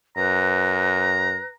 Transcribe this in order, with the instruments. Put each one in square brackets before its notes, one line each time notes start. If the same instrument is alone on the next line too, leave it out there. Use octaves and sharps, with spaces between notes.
[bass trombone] F#2 [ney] B4 [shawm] A#5